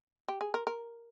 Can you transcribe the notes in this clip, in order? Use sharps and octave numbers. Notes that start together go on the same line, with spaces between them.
G4
G#4
A#4
A#4